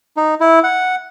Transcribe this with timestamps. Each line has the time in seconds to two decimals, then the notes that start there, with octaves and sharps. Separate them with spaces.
0.17 D#4
0.40 E4
0.64 F#5